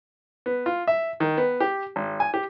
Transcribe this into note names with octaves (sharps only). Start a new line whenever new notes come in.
B3
F4
E5
D#3
B3
G4
G#1
G#5
G4